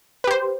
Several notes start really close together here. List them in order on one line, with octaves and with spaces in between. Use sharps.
B4 G4 C5